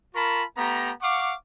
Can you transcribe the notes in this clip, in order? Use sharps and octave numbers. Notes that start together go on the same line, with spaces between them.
F4 A#4 A5 B5 C#6
A3 B3 G4 A#5
F5 F#5 C#6 D6